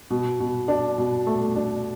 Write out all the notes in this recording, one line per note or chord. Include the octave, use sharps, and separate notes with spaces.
B2
B2
D4
B2
A3
D4